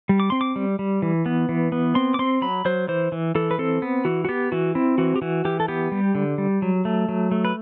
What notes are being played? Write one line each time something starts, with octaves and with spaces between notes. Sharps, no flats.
G3
D6
C4 C6
D6
G3
G3
E3
B3
E3
B3
C4 C6
D6
C4 C6
F#3 B5
F#3 C5
E3 C5
E3
E3 A4
B4
C4 A4
B3
E3 F#4
F#4
B3 G4
E3 F#4
C4 E4
E3 F#4
G4
E3 F#4
E3 G4
A4
B3 G4
G3
D3
G3
F#3
A3
F#3
A3
B4